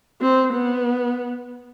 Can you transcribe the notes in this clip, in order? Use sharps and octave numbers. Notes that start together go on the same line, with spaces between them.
C4
B3